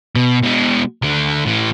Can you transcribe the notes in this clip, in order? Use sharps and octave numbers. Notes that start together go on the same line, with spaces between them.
B2
B2 G#3
D2 D3
A2 E3